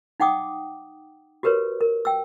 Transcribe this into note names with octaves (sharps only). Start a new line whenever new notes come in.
D#4 F#5 G5 D6 D#6
F#4 G4 A#4 B4 C#5
A#4
G5 E6